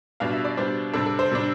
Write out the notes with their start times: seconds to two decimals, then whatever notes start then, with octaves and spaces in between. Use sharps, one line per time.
0.20 B2 G3 D4 F5
0.33 E5
0.45 D5
0.57 B2 G3 D4 C5
0.94 C3 G3 D4 A4
1.06 A4
1.19 C5
1.31 C3 G3 D4